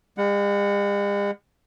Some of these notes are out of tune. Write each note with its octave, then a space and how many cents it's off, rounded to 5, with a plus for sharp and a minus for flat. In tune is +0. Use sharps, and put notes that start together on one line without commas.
G#3 -45 F#5 +0